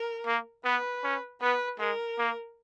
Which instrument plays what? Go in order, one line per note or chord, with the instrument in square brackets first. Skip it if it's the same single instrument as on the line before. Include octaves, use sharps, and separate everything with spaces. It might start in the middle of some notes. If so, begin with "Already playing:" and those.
Already playing: [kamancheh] A#4
[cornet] A#3
[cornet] B3 [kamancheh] B4
[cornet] C#4
[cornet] B3 [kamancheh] B4
[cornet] G#3 [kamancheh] A#4
[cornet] A#3